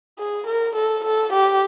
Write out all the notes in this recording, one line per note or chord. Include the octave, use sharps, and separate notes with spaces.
G#4
A#4
A4
A4
G4